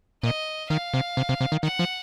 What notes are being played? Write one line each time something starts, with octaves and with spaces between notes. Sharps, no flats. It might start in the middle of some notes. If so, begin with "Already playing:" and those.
A#2 D#5
D#3 F5
C3
C3
C3
C3
D#3
D#3 F#5
F3